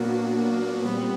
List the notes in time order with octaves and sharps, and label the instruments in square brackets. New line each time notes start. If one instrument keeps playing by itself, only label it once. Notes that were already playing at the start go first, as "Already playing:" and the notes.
Already playing: [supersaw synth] A#2 F#3 B3 D4 F#4 [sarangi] A#3
[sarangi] A#3
[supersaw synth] A#2 G3 C4 [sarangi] B3